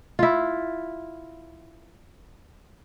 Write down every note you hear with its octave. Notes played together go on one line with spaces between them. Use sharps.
E4 F4